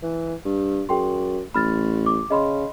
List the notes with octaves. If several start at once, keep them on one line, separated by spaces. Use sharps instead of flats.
E3
G2
F#2 G#4 G5 C6
A1 B5 F6 A6
D6
C#3 D#5 B5 C6